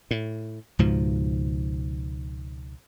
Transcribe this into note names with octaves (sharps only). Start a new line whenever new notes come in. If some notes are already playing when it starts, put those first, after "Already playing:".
A2
C#2 G#2 B2 F3